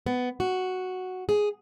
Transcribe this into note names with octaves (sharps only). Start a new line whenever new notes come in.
B3
F#4
G#4